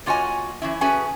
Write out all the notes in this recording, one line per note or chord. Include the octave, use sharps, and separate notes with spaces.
A#3 F4 F#4 C#5 D#5 G#5
E3 C#4 E4
A3 C#4 F#4 G#4 B4 G#5